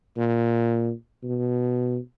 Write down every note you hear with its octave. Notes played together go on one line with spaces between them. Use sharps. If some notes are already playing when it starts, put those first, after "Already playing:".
A#2
B2